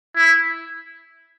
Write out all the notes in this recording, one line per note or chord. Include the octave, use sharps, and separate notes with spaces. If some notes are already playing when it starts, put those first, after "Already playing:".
E4